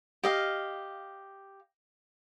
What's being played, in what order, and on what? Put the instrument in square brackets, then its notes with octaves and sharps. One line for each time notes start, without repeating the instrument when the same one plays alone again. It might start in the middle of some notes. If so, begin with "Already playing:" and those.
[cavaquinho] G4 D#5 F5